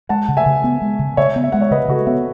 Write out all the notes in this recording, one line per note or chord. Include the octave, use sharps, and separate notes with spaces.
G#3 F#5 A5
C#3
E5 G#5
C#3
B3
G#3
C#3
C#3 C#5 E5
B3
E5
G#3 F#5
C#5 E5
C#3 B4 D#5
C#3 F#4 A4
B3 C#5 E5